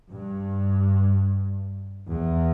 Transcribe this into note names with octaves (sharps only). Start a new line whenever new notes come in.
G2
E2